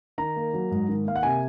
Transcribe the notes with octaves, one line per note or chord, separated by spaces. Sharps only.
D#3 A#5
A#3
F#3
G#2
D#3
A#3 F5
F#5
C3 G#5